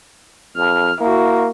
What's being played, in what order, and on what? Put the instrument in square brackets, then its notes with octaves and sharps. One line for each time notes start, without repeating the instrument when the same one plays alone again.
[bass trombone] F2 [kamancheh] F6
[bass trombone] A#3 [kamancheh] E4 F#4